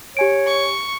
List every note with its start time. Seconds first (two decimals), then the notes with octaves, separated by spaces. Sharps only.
0.17 G4 C#5 G#5 D7
0.46 C#6